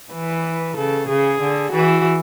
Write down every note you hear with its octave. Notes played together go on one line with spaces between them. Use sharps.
E3 B4
C#3 A4
C#3 G#4
D3
E3 F#4